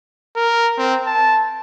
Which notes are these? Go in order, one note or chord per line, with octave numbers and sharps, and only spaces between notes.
A#4
C4
A5